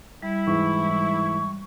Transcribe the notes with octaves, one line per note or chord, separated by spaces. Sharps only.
G3 E4
G#2 E3 C#6